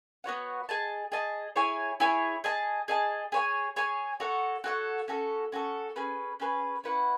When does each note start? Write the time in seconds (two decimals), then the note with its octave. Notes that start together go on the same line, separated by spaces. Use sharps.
0.24 B3 F#4 C#5 F#5
0.69 G#4 D#5 A5
1.12 G#4 D#5 A5
1.56 E4 G#4 C#5 G#5
2.00 E4 G#4 C#5 G#5
2.44 G#4 D#5 A5
2.88 G#4 D#5 A5
3.32 G#4 C#5 G#5
3.76 G#4 C#5 G#5
4.20 F#4 A4 C#5 F#5
4.64 F#4 A4 C#5 F#5
5.08 C#4 F#4 A4
5.52 C#4 F#4 A4
5.96 C#4 G#4 B4
6.40 C#4 G#4 B4
6.84 C#4 E4 B4 F#5